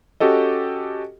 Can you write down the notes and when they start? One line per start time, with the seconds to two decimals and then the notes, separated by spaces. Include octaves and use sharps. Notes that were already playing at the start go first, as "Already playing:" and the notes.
0.20 C#4 F#4 G4 A4 D#5